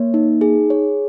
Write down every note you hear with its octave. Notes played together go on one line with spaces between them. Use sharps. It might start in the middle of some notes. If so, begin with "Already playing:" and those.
Already playing: A#3 C#5
D#4
G#4
C#5